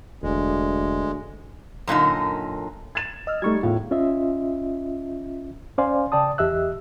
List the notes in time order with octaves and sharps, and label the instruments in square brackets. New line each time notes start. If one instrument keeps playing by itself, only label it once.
[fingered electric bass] E1 [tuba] D2 [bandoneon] G#3
[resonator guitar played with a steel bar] F#2 A#2 D3 D#4
[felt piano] G#6 A6 E7
[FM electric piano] D#5 E6 F6
[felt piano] G3 D#4 [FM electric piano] A3 C#6 G#6
[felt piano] E2 A2 [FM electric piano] F4
[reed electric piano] C#4 F4 D#5 E5
C#4 C5 D5 F5 G#5 C6
C#3 D5 G5 A5 D#6
E2 G4 D#5 E5 E6 F#6